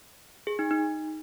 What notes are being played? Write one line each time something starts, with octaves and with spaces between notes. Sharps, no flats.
G#4
D#4
D#4